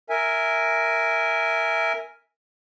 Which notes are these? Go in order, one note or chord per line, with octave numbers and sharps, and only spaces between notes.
A#4 E5 G#5